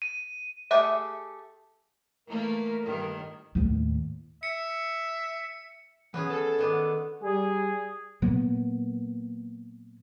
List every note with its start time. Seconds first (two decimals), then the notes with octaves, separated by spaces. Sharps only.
0.02 D#7
0.71 A3 G4 G#4 E5 F#5
2.27 E3 A3 A#3 A#4
2.83 G2 D#3
3.55 D#2 A2
4.43 E5 C#7
6.14 E3 B3 C#4 G#4
6.30 A4 A5
6.59 D#3 B3 D4
7.22 G3 G#4
8.22 A#2 F#3 A#3 B3